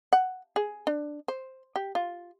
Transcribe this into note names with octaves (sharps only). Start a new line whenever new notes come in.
F#5
G#4
D4
C5
G4
F4